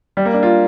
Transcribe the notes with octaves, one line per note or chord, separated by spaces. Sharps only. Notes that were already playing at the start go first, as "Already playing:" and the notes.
G3
A#3
D4
F4